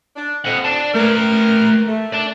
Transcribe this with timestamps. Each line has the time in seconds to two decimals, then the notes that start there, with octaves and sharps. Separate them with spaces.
0.16 D4
0.45 F2 C4 D#5 F#5
0.64 D5 A5
0.94 A3 A#4 B4
1.87 A3
2.13 D5 A5